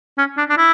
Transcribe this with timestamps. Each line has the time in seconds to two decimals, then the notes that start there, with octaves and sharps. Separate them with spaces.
0.18 C#4
0.38 D4
0.49 D4
0.57 E4